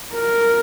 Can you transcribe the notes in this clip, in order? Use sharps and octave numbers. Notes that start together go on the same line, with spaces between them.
A#4